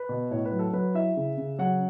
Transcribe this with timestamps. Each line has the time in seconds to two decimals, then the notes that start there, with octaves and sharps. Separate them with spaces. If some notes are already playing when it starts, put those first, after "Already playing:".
Already playing: B4
0.09 B2
0.31 A2 C#5
0.46 B4
0.52 F#3
0.59 A4
0.73 F#3 B4
0.95 E4 E5
1.16 C#3
1.38 C#3
1.59 F#3 F#5